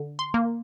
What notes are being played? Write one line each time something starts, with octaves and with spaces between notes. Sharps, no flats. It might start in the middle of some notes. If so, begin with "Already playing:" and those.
Already playing: D3
C6
A#3